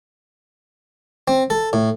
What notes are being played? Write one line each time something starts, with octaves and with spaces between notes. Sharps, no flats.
C4
A4
A2